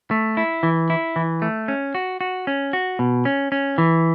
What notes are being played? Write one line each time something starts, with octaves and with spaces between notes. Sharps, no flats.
A3
E4
E3
E4
E3
A3
C#4
F#4
F#4
C#4
F#4
B2
C#4
C#4
E3